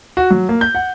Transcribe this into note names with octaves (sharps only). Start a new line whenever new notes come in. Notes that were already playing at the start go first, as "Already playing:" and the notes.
F#4
F#3
A#3
G6
F#5